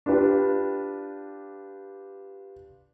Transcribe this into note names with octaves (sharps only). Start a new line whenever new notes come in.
D4 F4 G4 B4 G5